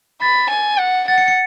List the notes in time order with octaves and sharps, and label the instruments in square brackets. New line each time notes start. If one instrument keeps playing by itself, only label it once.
[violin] B5 [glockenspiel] A6
[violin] G#5
F#5
[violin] F#5 [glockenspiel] A6
[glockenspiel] C#7
C#7